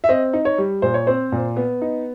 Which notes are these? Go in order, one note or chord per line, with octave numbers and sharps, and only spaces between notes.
E5
C4 D#5
D#4
C#5
G3
A#2 C5
C#5
C4 C5
A#2
B3
D#4